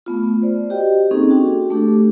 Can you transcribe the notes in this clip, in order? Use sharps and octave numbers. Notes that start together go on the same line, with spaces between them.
A3 B3 F4
C5 D5
F#4 G4 D#5 G5
A#3 C4 C#4 D#4 G#4 A4
D4 F#4 G5
A3 D4 G4 A4